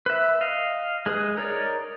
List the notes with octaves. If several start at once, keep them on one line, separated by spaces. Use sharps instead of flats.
B4 E5
D#5 F5
G#3 G#4 B4 D#6
D#4 A#4 C#5 D5